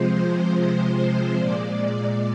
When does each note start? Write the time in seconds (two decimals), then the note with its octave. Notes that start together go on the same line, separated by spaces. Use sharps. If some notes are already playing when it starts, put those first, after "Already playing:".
Already playing: C3 F3 G#3 C5
1.37 A#2 G#3 D5